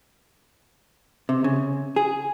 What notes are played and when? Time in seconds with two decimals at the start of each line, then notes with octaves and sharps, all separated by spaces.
1.29 C3
1.44 C#3
1.96 G#4